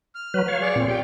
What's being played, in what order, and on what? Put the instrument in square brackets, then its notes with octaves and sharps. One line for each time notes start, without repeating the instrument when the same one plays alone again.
[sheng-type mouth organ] F6
[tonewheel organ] F#3 B4
C#5 F5
[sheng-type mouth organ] G#4 D5 C#6
[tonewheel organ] A#2 C4
[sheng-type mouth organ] G4 [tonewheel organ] G5